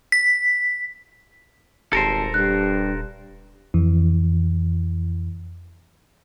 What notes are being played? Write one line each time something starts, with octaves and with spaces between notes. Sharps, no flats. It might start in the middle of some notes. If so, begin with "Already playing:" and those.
B6
D#1 G#1 G4 A4 A#4 C5 A5
G2 G4 F#6
F2 E3